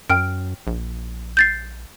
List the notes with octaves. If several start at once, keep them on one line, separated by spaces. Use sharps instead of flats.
F#2 G5 F6 D7
A#1
G6 A6 C7